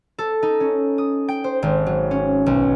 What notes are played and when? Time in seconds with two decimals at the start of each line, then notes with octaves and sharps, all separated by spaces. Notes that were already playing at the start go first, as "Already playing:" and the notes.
0.18 A4
0.43 D#4
0.60 C#4
0.98 D#6
1.28 G5
1.44 C5
1.62 G#1
1.86 F#3
2.11 C#4
2.46 B1